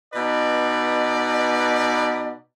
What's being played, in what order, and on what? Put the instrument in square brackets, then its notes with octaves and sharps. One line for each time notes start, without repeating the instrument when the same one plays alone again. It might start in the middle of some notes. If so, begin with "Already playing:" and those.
[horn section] B2 D#4 B4 D5